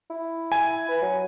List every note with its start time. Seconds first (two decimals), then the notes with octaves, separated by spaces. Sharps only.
0.10 E4
0.52 G#5
0.89 B4
1.02 F#3